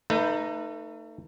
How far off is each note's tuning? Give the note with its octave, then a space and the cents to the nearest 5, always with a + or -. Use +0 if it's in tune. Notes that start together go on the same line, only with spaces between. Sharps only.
A3 +30 D#4 -5 B4 +0